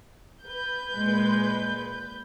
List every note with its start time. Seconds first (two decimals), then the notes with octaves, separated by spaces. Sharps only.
0.43 B4 G6
0.94 A#2 G#3